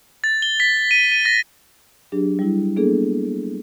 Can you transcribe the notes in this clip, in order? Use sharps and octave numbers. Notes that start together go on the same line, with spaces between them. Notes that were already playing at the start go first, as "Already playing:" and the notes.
A6
G7
B6
D#7
D#7
A#6
F#3 D4 G4 G#4
G3 E4
A#3 B3 D4 G#4 A4